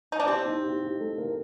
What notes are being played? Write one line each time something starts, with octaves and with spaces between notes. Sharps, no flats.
D#4
D4
C4 G4
D#4
G4
G4
A3
A#4